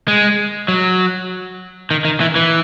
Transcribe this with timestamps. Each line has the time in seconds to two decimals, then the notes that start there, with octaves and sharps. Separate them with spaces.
0.08 G#3
0.68 F#3
1.91 D#3
2.05 D#3
2.20 E3
2.36 E3